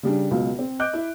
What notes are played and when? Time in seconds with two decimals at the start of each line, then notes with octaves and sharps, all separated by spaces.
0.03 C#3 G3 D4
0.31 C#2 B2 F#3 F5
0.59 C4
0.79 D#5 D6 F#6 G6 D7
0.93 E4 E5